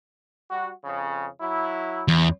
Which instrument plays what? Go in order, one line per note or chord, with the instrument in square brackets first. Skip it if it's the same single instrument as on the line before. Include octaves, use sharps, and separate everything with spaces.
[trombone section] G3 F#4
F2 C#3
F#3 E4
[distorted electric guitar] E2